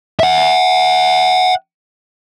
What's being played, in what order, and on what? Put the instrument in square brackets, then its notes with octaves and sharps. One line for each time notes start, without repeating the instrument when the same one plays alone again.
[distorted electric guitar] E5 F#5